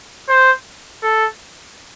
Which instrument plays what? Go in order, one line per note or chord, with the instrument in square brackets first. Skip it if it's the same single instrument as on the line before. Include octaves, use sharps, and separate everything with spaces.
[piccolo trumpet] C5
A4